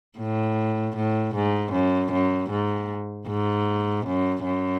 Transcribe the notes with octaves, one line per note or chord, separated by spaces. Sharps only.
A2
A2
G#2
F#2
F#2
G#2
G#2
F#2
F#2